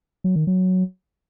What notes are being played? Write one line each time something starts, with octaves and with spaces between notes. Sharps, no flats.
F#3
D#3
F#3